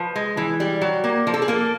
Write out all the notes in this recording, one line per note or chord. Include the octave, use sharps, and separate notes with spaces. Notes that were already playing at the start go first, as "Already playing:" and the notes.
Already playing: F3 B4
G#3
E3
G3
F#3
A#3
F3 A#4
A4
G#4
A#3 A4